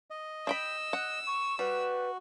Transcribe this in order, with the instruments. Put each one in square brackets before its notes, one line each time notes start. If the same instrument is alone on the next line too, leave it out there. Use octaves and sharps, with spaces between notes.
[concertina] D#5
[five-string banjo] D4 G5 B5 [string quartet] E6
[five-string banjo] F#5
[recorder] C#6
[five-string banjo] G3 [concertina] F#4 [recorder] B4